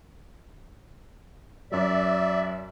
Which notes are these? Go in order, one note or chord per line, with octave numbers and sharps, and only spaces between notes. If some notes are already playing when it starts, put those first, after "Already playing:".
F#2 F#3 D5 E5